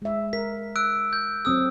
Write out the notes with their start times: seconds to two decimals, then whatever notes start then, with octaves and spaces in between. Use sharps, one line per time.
0.02 G#3 E5
0.33 A#4 B6
0.76 E6 F#6 D7
1.13 G6
1.45 F#3 C4 A4 D#6 E6